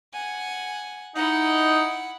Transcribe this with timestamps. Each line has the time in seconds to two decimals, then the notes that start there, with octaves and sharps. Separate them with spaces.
0.13 F#5 G#5
1.15 D#4 E4 F#5